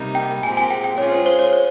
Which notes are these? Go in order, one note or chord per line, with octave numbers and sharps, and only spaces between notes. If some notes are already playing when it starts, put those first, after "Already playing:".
Already playing: C3 G3 A#3 D#4
G5
A#2 G#3 C4 G4 G#5
G#5
G5
G5
G#3 C#4 F4 G#4 C#5
C5
C5
C#5
C5